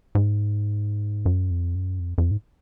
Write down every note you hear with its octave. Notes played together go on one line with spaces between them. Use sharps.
G#2
F#2
F2
F#2
F2
F2
G#2